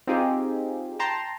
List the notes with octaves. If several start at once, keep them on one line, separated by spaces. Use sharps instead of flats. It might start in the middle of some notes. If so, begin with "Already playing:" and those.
C4 D#4 F4 G4 G#4
G5 A5 A#5 C6